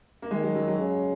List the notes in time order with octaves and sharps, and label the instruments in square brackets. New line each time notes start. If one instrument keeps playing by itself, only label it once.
[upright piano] A#3
[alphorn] D#3 [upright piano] G#3
[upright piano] F#3
F#3
F#3
[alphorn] C#3